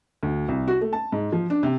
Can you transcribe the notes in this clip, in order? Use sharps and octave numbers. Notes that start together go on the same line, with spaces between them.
D2
C2
F#4
A3
A5
G#2
F3
D4
C3